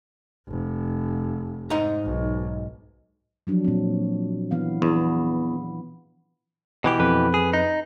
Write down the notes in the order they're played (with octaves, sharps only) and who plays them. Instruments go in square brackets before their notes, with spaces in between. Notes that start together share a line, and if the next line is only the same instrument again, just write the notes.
[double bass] F1
[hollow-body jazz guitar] G#2 D#4 A#5
[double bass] B1
[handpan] F3 F#3 D4
A#2 C4
E3 B3 F5
[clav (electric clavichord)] E2 [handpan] B3
[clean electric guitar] B2 E3 G4
[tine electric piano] F2 B4
[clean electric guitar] G#4
D#4